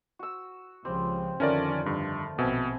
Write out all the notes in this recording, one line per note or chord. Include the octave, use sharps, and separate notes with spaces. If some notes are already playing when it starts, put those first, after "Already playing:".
F#4 E6
C#2 C#3 F3 G3 C4
F2 D3 D#3 A3 C#4 F4 A#4 D5
G2
A#1 B2 C4 E5 G#5 B5